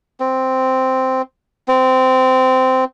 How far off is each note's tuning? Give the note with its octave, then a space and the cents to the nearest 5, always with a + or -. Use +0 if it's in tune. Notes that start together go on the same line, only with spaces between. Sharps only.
C4 -5
C4 -15